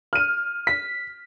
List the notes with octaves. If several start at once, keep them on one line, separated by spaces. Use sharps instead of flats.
F6 D#7
B6